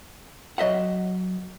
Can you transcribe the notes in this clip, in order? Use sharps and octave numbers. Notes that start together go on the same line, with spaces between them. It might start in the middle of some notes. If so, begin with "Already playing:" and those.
F#3 D#5 E5 F#5